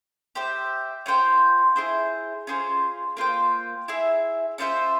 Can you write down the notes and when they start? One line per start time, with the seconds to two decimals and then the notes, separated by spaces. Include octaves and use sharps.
0.35 G4 C5 E5
1.06 C#4 F4 C5 G5
1.76 E4 G#4 C5
2.47 C#4 F4 G#4 C5
3.17 A#3 F4 C5 G5
3.88 E4 G#4 E5
4.58 C#4 F4 C5 E5